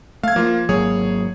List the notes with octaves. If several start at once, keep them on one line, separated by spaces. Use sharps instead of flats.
A3 F5 G#6
F3 A#3 F4
G#1 F#3 A#3 G#4 C#5